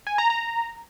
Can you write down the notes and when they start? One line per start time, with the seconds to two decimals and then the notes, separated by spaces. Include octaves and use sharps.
0.07 G#5
0.18 A#5
0.30 A#5